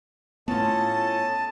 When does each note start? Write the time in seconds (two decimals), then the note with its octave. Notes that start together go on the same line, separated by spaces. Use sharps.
0.48 A2 B3 C#4 F4 A4 D#5 A5